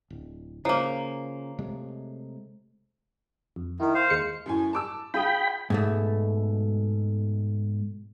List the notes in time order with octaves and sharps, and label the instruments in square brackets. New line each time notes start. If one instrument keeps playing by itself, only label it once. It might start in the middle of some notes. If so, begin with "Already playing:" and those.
[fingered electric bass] D1
[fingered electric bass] C#3 [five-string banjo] F3 A#3 [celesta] C#5 A#5 C7
[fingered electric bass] C3 G#3 A3
[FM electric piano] F2
[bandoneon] D#3 [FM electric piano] E4 A#4
[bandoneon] C5 F5
[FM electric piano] D#2 G#3 C#7
[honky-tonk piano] F#2 A2 G#5
A5 D6 E6
[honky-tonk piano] F4 G#4 D#6 [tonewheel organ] G5 B5
[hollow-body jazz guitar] G#2 B2 A3